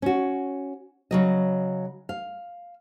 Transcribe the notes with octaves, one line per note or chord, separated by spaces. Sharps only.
C#4 F#4
C#3 F#3 D#5
F5